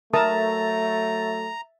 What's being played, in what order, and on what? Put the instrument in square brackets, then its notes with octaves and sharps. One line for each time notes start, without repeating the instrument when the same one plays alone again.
[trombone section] F#3 A3 [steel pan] A#4 A5 D#6 [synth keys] E5 A6 [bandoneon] A#5